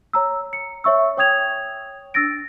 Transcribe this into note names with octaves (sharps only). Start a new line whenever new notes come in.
C#5 A#5 E6
C#7
C#5 E5 C#6 E6
C#5 G5 D#6 G#6 F7
D4 E6 A6 A#6 D7